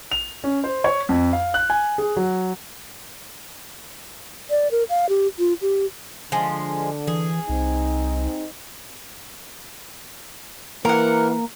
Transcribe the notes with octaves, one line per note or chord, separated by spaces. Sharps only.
F7
C#4
C5
C#5
F2
F5
F#6
G#5
G#4
F#3
D5
A#4
F5
G4
F4
G4
D3 F3 G#3
E3 G#4
C2 C4 D#4
E3 A#3 A#4 F#5